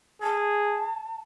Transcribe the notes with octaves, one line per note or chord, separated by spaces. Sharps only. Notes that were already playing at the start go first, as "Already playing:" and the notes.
G#4 A5